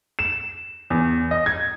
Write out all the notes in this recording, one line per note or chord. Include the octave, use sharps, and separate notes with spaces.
E7
E2
D#5
G#6